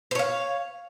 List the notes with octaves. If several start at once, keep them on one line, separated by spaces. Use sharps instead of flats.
C5 C#5 F5